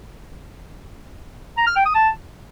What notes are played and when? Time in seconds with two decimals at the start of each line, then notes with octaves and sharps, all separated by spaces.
1.58 A#5
1.67 F6
1.76 G5
1.85 D#6
1.95 A5